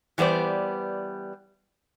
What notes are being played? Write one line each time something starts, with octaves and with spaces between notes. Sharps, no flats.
E3 G3 B3 C5 D5